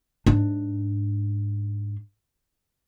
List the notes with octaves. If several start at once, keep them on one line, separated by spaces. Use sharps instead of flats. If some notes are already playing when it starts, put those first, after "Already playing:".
G#2 D4